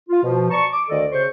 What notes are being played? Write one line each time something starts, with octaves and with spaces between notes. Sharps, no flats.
F4
B2 F3
D5 A5 A#5 C#6
D6
D2 D#3 A4 D5 D#5
C#3 C5 C#6